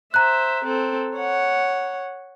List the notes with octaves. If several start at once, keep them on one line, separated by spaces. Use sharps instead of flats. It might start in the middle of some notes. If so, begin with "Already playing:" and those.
C5 E5 A#5 F#6
C4 A4
C#5 F#5